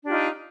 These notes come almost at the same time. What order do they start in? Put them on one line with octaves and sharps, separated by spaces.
D4 G4 F4 D#4